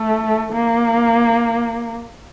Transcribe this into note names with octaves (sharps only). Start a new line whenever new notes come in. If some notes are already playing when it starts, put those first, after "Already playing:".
Already playing: A3
A#3